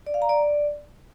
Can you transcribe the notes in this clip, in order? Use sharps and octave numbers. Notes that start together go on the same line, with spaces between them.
D5
F5
A#5
D5